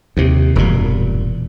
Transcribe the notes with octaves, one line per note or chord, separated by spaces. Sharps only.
D#2 C3
E1 G2 A#2